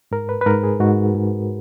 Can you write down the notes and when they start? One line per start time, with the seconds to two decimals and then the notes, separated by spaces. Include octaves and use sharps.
0.11 G#2 A#4
0.29 B4
0.41 B4
0.46 G#2 A#4
0.63 G#4
0.80 G#2 F#4
1.14 G#2